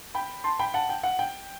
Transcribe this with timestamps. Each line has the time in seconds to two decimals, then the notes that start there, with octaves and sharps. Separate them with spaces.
0.15 G5 B5
0.44 A5 C6
0.59 G5 B5
0.74 F#5 A5
0.89 G5
1.03 F#5
1.19 G5